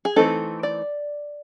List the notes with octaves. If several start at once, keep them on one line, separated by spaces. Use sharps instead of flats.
G#4
E3 A3 C4 D#4 A4
D5